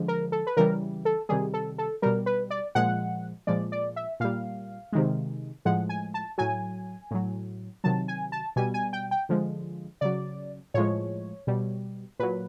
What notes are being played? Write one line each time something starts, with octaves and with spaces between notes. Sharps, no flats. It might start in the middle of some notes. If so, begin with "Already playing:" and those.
Already playing: D3 F3 G#3
A#4
A4
B4
C#3 E3 G3 A#4
A4
C3 D#3 G3 G#4
A4
A4
B2 G3 A#4
B4
D5
A#2 F3 G#3 F#5
A#2 F3 G#3 D5
D5
E5
A#2 G3 F5
C3 D#3 G#3
A2 F3 G#3 F#5
G#5
A5
A2 F#3 G#5
A2 F#3
C3 D#3 F#3 A5
G#5
A5
B2 G3 G#5
G#5
G5
G5
D3 F3 G#3
C#3 F#3 D5
A2 F3 G#3 C#5
B2 G3
A#2 F#3 B4